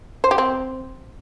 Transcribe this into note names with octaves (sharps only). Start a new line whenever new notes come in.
C5
G4
C4